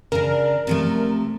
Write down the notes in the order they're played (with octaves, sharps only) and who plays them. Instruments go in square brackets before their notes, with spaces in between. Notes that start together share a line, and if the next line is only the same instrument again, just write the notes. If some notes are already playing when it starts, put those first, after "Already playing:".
[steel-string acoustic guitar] C#3 D4 [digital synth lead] A#4
[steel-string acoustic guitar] C3 F3 A3